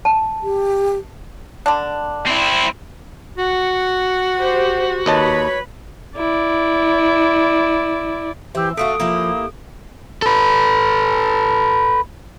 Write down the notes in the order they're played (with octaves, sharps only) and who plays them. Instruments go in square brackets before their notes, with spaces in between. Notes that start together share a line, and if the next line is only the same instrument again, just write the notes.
[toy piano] A5
[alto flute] G4
[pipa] D3 D4
[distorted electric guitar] C4 E4
[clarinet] F#4 [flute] F#5
[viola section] G4 C5
[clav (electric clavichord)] D#2 D#5 A5 [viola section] B4 B5 [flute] C#5
[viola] E4 D5
[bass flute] E3 [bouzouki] C4 [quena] G4 [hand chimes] E5 E6
[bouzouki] A3 F4 F#4 [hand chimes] A4 D7 [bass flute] E5 [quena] D#6
[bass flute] F3 [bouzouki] A#3 E4 G4
[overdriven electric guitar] A4 B4